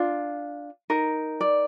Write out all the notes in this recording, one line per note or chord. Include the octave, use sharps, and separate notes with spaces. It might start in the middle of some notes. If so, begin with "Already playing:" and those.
Already playing: D4 F4
D#4 A#4
D5